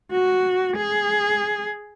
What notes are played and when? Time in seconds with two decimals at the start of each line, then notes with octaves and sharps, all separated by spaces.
0.12 F#4
0.76 G#4